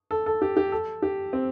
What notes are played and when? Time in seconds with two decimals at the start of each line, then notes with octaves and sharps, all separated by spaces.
0.11 A4
0.26 A4
0.42 G4
0.57 G4
0.72 A4
1.02 G4
1.33 C4